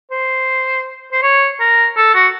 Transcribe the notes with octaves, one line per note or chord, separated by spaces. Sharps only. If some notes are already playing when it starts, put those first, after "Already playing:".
C5
C5
C#5
A#4
A4
F#4